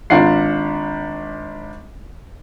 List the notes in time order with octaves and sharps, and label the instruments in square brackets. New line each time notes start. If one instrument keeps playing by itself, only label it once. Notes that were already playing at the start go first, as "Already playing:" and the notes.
[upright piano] G#1 D4 F4 F#5 C7